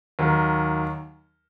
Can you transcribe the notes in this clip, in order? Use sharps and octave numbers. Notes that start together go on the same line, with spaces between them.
D#2 D#3 F#3